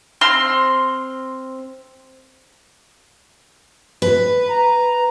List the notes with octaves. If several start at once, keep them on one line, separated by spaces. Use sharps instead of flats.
C4 C6 F6
B4
A#5